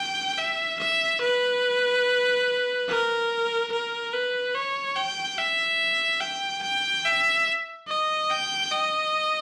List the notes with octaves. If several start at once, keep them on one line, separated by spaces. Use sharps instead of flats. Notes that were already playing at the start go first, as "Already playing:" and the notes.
Already playing: G5
E5
E5
B4
A#4
A#4
B4
C#5
G5
E5
G5
G5
E5
D#5
G5
D#5